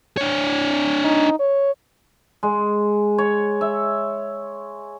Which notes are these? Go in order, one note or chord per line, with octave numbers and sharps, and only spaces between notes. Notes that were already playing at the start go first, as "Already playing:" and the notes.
D4 C#5
D#4
C#5
G#3
C#5
E5